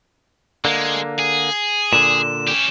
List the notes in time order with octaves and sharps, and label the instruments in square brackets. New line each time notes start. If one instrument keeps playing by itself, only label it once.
[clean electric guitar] D3 A#3 [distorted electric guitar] G#3
[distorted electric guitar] G#4
[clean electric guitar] A#2 D3 [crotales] E7
[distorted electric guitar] C#4 G4